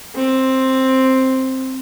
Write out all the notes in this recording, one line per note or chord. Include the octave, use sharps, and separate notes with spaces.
C4